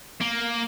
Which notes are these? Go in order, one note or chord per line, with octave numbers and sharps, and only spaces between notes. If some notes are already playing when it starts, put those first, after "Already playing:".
A#3